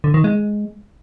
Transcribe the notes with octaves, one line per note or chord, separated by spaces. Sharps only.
D3
D#3
G#3